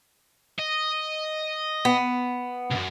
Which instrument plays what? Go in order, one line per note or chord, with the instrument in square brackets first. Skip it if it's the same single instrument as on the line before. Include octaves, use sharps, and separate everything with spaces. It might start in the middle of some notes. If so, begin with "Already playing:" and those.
[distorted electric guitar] D#5
[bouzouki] B3
[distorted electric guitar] C2 F#2